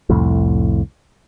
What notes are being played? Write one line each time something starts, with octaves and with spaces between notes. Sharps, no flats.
C2 F2 A2